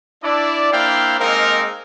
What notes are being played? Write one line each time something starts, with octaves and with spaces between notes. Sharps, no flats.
D4 E4 D5
A#3 D4 E4 C5 F5 G5
G#3 A#3 C4 D#4 A#4 F5